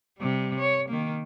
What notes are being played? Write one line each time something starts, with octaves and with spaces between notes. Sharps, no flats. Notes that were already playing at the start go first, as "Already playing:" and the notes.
C3 G3
C#5
D#3 A#3